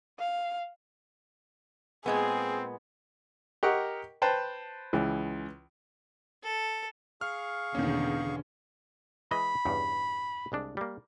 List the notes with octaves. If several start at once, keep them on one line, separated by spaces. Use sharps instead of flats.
F5
A#2 G#3 B3 C4 G#4
G4 A#4 D#5 F#5 C#6
B4 C5 G5 A5
C#2 E3 G#4
A4
G#4 F5 C#6 F6
E2 B2 D3 D#3 A#3 C#4
E3 G#3 D#5 B5
E2 G2 C#3
C2 G#3 D4
G3 A#3